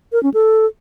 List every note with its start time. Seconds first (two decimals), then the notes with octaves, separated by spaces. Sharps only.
0.12 A#4
0.23 C#4
0.34 A4